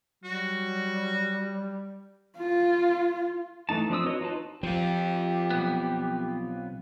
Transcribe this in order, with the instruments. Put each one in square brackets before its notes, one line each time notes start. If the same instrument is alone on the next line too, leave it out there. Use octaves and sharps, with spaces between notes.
[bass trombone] F#3 [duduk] G3 [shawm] F#4
[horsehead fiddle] F4
[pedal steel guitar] E3 A3 D#4 A5
F3 C4 D4 D#6 E6
F#4 B4 C#5 D#5
D#4 F4 B4 A5
[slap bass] F3 [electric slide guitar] C4 F4 [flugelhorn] G4
[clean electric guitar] B1 E2 B3